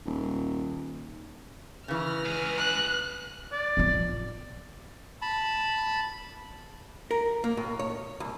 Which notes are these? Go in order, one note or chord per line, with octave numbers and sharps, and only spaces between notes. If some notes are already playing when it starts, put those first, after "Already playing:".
D#1
C#3 E3 B4 F6 A#6
C#2 G#4
F#6
D5
A1 F4
A5 B5
A#4
A#3
A2
C#5
C2